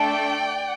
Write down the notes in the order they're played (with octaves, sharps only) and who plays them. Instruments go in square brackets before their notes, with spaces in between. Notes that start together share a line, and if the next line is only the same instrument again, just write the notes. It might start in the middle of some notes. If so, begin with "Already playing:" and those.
Already playing: [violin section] A3 D4 A4 D5 G5